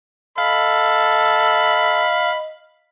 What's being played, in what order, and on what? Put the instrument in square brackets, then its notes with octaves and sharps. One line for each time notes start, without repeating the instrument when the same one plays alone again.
[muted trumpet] A4 [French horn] D#5 [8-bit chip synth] F5 [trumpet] B5